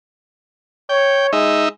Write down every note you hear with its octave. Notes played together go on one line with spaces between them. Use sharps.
C#5 G5
G#3 D#4 E5